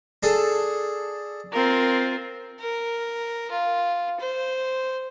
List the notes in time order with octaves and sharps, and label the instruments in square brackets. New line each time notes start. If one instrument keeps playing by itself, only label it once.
[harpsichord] D4 G#4 A4
[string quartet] C4 F4 A#4
[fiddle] A#4
F4
C5